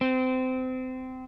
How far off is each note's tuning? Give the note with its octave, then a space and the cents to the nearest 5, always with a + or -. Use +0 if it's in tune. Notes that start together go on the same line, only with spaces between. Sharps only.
C4 -25